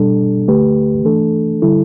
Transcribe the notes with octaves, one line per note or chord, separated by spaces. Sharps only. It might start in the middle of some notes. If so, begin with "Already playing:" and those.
Already playing: B2 G3 D4 A4
D2 D3 A3 G4 B4
E3 A3 D4 A4
D3 G3 E4 A4